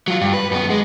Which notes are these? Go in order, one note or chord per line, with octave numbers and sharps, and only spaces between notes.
F#3 F4
G2
B4
F#2 B3
G#3